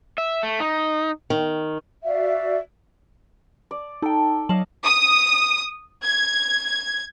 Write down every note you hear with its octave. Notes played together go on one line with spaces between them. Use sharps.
E5
A3
D#4
D#3
F#4 D5 E5 F5
D5
D#4 A4 G5
F#3 C#5 D#5 F5 A5 F#7
D#6
G#6